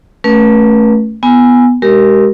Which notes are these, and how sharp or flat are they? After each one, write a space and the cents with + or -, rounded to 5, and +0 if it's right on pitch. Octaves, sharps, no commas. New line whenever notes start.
A3 +0 C#4 +0 B4 -40
B3 +0 G#5 -5
G#3 +0 G4 -25 A#4 +0